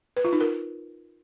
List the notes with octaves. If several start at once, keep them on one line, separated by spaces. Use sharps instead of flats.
B4
F4
D#4
A#4